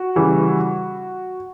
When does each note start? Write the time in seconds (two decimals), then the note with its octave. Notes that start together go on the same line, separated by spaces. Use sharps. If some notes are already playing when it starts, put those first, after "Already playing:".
Already playing: F#4
0.16 C#3 E3 G3